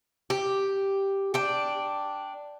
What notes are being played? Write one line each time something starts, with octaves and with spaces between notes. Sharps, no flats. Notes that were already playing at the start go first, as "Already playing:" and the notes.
G4
D4 G5